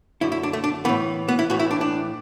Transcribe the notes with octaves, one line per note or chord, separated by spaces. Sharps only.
F#2 D3 E4
E4
D4
A3
D4
A2 E3 B3
B3
E4
A2 E3 F#4
E4
D4
D4